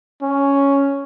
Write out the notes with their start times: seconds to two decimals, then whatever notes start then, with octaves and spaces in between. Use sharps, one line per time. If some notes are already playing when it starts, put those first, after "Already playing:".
0.22 C#4